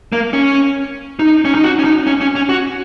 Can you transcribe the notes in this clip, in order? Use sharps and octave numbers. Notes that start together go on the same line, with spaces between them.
A#3
C#4
D#4
C#4
D#4
F#4
C#4
D#4
C#4
C#4
C#4
F#4